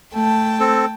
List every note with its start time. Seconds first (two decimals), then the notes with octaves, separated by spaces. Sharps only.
0.14 A3 G5 A5
0.60 C4 A4